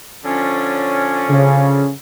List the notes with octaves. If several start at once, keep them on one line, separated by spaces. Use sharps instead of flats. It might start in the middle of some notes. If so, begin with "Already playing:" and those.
D3 F3 C#4
C#3